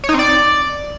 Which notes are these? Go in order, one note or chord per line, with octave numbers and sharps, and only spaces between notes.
C#5
D#4
C4
D5